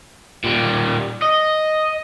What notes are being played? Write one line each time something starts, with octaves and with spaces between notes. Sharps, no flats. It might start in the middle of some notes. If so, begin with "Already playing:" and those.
A#2 G3
D#5